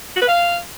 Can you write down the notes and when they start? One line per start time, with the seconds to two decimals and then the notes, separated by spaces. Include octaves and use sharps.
0.16 F#4
0.22 B4
0.28 F5